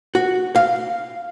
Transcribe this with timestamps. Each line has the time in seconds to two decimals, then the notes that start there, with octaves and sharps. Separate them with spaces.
0.15 F#4
0.56 F5